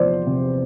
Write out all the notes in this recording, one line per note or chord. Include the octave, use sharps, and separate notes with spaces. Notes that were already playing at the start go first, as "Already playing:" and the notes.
Already playing: E2 C3 F3 B3 C5 D5
C3